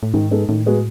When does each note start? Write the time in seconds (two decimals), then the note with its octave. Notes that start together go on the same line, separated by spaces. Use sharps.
0.03 A2
0.14 G#2 D#3
0.31 G#3 B3 D#4 A4
0.49 A2 D#3
0.66 G#3 B3 F#4